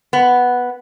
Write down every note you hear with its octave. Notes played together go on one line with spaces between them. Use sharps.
B3